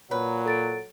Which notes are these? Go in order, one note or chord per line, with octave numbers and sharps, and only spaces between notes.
A#2 F#3 B4 C#5
A4 A6 D7